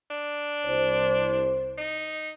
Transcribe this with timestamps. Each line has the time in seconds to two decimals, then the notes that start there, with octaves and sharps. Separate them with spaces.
0.11 D4
0.65 C2 C5
1.78 D#4